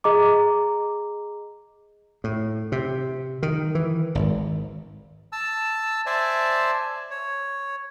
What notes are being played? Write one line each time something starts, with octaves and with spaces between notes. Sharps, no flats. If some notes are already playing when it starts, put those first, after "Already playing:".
G#4 D#5 A#5 D6
A2
C3
D#3
E3
G#1
A5 E6
C5 D5 E5 G#5 A5
C#5